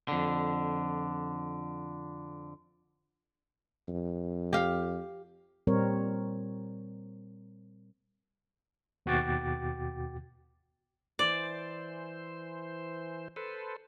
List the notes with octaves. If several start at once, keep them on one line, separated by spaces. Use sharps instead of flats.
F2 D3
F2
G4 F5
A#2 G3 C4 A#4 C#5
D#2 B2 F#4 G5 D6 A6
E3 C5 D5
A4 B4 C5